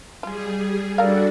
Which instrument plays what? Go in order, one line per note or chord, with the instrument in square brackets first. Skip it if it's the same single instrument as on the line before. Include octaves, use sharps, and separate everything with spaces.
[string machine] G3 G#4 [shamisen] G#3 F4
[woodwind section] G3 A4 [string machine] D4 F#4 [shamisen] A#4 F5